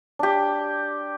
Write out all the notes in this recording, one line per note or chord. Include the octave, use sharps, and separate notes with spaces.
D4 G4